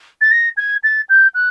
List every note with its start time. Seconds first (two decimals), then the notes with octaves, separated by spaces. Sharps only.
0.21 A6
0.31 A#6
0.57 G#6
0.83 A6
1.09 G6
1.34 F#6